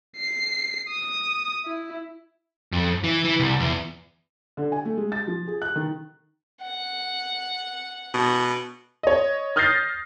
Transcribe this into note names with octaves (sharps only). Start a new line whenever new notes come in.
C7
D#6
E4
F2
E3
E3
C2
E2
D3
G#5
A3
G#3
A6
F3
G#4
F#6
D#3
F#5
B2
C#5 D#5
D#6 F6 G6 A6 A#6 C7